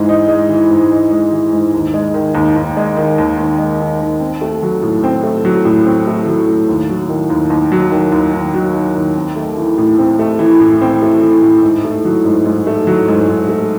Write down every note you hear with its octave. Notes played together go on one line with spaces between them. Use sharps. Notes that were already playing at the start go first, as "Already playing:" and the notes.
Already playing: G#2 E3 G#3
D#4
G#3
E3
G#2
D#4
G#3
E3
G#2
D#2
G#3
D#3
D#2
D#2
G#3
D#3
D#2
D#2
G#3
D#3
D#2
C4
A3
F#3
A2
C4
A3
F#3
A2
C4
A3
F#3
A2
D#2
F#3
D#3
D#2
D#2
F#3
D#3
D#2
D#2
F#3
D#3
D#2
C4
A3
E3
A2
C4
A3
E3
A2
C4
A3
E3
A2
G#2
A3
F#3
G#2
G#2
A3
F#3
G#2
G#2
A3